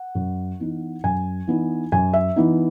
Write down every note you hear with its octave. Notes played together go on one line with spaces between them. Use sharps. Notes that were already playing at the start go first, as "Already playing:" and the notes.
Already playing: F#5
F#2
E3 B3 D#4
F#2 G#5
E3 B3 D#4
F#2 G#5
E5
E3 B3 D#4